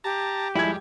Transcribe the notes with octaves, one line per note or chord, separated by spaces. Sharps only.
G4 A5 A#5
F2 G3 G#3 E4 G#6